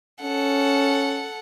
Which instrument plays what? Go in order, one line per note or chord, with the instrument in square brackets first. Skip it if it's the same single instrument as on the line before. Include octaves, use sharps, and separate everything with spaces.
[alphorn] C#4 [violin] A4 F#5